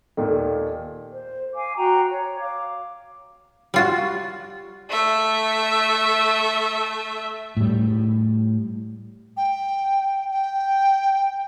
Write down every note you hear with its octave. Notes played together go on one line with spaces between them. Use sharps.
D#2 A#2 D#3 A4
C5
F5 G#5 D6
F#4 G5 A#5
C#5
F5 D6
G3 F4 F#4
A3 E5
A2 G3
G5
G5